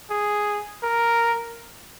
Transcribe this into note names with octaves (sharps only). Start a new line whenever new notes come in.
G#4
A#4